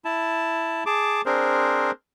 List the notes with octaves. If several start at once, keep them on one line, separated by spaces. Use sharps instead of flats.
E4 A5
G#4 A5 D6
C4 D4 G#4 A#4 C5